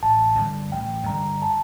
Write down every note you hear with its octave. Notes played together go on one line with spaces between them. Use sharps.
A1 A5
G2 D3 G3
A1 G5
G2 D3 G3 A#5
A5